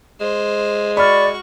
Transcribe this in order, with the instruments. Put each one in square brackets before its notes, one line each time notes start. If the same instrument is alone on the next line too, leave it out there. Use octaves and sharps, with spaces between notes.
[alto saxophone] G#3 [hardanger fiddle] C5
[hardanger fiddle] F#4 C#6 [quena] D5 [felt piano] B5 F6